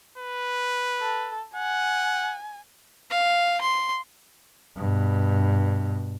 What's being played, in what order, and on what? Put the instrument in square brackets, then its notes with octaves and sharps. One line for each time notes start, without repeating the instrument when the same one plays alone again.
[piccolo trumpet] B4
[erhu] A4
[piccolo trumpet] F#5 [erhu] G#5
[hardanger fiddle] F5
C6
[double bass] G2 B2